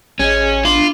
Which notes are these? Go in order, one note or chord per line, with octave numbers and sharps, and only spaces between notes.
A1 C#4 G#4 D#5
B3 D4 F4